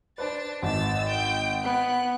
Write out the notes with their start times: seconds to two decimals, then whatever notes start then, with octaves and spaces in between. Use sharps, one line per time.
0.18 D4 B4 C5 A5 A6
0.62 G#1 E6 A6
1.08 G5
1.64 B3 F#6